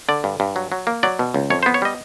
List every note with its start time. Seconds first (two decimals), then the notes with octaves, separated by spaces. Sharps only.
0.09 D3 D5
0.24 G2
0.40 G2
0.56 F#3
0.72 F#3
0.87 A#3
1.03 F#3 D5
1.19 B2
1.34 C#2
1.50 F2 C#5
1.63 C5
1.66 B3
1.74 C#5
1.82 G3 D#5